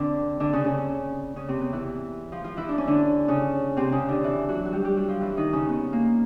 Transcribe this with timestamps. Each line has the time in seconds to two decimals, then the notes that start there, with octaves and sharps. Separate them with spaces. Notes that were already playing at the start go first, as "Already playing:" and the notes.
Already playing: D3 C4 D4
0.40 D3 D4
0.53 C#3 C#4
0.64 C#3 C#4
1.36 C#3 C#4
1.48 C3 C4
1.61 B3
1.73 E3 E4
2.32 F3 F4
2.44 F3 F4
2.57 E3 E4
2.69 D4
2.78 C#4
2.87 D3 D4
3.28 C#3 C#4
3.77 C3 C4
3.92 C#3 C#4
4.08 D3 D4
4.24 E3 E4
4.48 F#3 F#4
4.65 F#4
4.73 G3 G4
4.84 G3 G4
4.96 F#3 F#4
5.08 F3 F4
5.21 E3 E4
5.37 D#3 D#4
5.53 C#3 C#4
5.68 B3
5.93 A#3